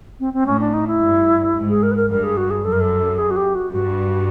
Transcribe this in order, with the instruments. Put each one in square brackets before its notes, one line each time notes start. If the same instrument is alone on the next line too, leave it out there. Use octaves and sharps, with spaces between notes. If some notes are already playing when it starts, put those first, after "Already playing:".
[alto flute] C4
C4
[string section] A2 [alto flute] C#4
[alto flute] D4
D#4
E4
[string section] G2
G#2
[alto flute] G#4
A#4
B4
A#4
[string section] G2 [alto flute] A#4
[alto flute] G#4
F#4
G#4
[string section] F#2 [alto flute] A4
[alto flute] A#4
A4
G#4
F#4
G4
F#4
[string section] G2 [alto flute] F#4